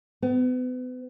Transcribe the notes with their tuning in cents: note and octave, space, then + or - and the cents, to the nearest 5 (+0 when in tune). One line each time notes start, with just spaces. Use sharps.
B3 +35